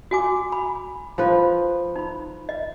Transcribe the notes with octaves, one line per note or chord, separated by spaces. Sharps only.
F#4 G#5 D6
B5
F3 B4
D#4 B5
D#5